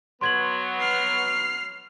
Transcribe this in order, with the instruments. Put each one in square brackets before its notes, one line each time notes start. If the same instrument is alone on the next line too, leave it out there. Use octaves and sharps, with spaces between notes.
[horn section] F#3 B3 [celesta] C6 G#6 F#7
[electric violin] F6 C7